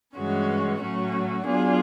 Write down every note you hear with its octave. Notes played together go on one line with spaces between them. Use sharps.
G2 E3 G#3 C#4 F#4
A2 F#3 A3 C#4 F#4
F#3 B3 D4 F4 G#4